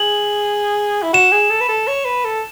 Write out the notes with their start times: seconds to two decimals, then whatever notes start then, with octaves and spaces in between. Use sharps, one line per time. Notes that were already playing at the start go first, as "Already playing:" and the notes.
Already playing: G#4 F#7
1.03 E4
1.13 F#4 E7
1.32 G#4
1.50 A4
1.61 B4
1.69 A4
1.88 C#5
2.05 B4
2.25 A4